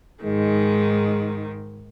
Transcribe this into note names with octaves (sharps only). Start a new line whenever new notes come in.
G#2 D#3 G#3